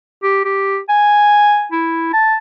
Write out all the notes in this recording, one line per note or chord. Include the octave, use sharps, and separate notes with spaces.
G4
G4
G#5
E4
A5